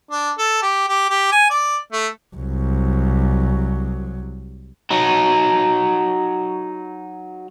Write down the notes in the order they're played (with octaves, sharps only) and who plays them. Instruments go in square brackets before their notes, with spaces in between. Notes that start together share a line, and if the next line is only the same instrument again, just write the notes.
[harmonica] D4
A4
G4
G4
G4
G#5
D5
A3
[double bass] C2 F#3
[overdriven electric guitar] F#3 D#4